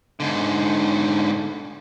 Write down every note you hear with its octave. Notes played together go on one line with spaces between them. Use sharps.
G#2 D3